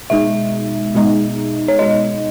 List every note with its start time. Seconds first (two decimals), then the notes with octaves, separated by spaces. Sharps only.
0.10 B2 G#3 D#4 E5
0.95 B2 G#3 D#4
1.68 C#5
1.79 B2 G#3 D#4 D#5